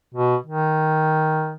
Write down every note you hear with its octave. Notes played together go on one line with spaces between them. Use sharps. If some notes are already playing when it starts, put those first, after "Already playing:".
B2
D#3